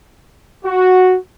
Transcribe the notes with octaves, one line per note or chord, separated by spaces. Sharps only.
F#4